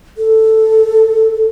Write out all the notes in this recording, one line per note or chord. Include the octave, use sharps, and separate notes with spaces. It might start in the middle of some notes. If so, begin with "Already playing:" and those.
A4